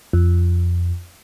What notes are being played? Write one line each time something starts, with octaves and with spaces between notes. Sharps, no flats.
F2